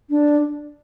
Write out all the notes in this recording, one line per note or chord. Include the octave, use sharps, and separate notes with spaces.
D4